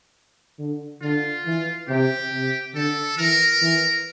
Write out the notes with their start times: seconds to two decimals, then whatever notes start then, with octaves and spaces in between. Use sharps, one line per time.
0.59 D3
1.02 D3 F4
1.45 E3
1.88 C3 G4
2.32 C3
2.75 D3 A4
3.18 E3 A#4
3.62 E3